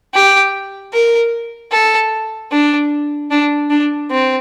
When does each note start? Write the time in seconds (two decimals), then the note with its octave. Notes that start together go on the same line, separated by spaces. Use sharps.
0.14 G4
0.93 A#4
1.72 A4
2.51 D4
3.31 D4
3.70 D4
4.10 C4